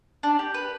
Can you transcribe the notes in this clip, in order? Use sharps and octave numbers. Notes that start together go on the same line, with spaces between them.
D4
G4
B4